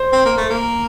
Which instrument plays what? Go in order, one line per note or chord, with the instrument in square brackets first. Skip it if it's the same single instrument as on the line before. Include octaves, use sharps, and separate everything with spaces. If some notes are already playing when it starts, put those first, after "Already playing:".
Already playing: [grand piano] C5
[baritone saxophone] C4
A#3
A3
A#3